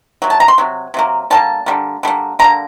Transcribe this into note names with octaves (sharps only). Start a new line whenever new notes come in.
C3 F#3
A5
A#5
C6
C3 F#3
C3 F#3 A#3
D3 G3 A#3 A5
D3 G3 A#3
D3 G3 A#3
D3 G3 A#3 A#5